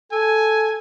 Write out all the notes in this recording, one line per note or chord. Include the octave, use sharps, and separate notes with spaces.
A4 G#5